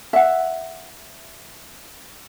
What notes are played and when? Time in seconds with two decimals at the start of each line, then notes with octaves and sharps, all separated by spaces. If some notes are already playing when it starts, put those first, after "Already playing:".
0.13 E5 F#5